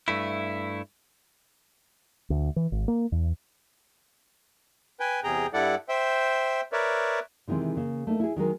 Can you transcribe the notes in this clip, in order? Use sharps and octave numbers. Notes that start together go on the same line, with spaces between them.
G2 A3 E4
D2
E3
G#1
A#3
E2
B4 G5 G#5
E2 C3 G#4 G5 A#5
G2 G3 E4 A4 D5 F#5
C5 E5 G5
A#4 B4 C#5 D5 E5
C3 D#3 E3 G#3 C4
C#3 A#3
A3 A#3 D#4
E4 G#4
D#3 F#3 G#3 A#4